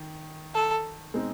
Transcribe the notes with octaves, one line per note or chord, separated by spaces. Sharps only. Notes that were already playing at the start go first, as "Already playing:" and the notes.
Already playing: D#3
A4
B2 G#3 C4 D#4